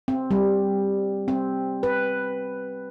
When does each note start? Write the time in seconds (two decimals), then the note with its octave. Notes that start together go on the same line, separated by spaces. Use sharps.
0.08 C4
0.31 G3
1.28 C4
1.83 B4